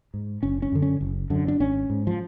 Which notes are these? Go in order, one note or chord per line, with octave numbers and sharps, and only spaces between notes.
G#2
F#1 C#4
C#4
F#2 D3
C#4
F#1
F#2 D3
D4
G#1 C#4
G#2
F3